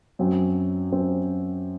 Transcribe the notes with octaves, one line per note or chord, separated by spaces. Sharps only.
F#2 F#3 C4
F#2 F#3 C4